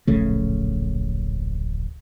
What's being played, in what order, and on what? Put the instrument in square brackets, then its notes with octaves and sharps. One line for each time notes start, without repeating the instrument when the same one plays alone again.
[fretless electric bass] D1 A#1 C#3 A3